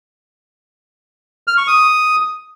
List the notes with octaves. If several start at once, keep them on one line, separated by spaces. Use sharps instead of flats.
F6
C#6
D#6